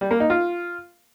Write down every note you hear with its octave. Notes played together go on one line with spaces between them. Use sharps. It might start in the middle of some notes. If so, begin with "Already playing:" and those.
G3
A#3
D#4
F4